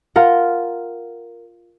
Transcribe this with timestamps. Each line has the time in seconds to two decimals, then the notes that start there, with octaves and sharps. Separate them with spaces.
0.16 F4 A#4 F#5